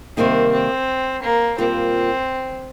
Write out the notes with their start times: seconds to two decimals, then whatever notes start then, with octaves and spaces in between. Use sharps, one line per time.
0.17 C3 D#3 G3 A#3 C4 D#4
0.52 C4
1.23 A#3
1.58 A#2 G3 A#3 C4 F4 C5